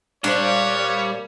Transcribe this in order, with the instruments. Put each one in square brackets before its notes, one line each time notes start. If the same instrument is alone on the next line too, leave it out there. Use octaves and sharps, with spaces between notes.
[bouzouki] A#2 A#3 C5 [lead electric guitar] G3 [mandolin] D4 [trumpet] C#5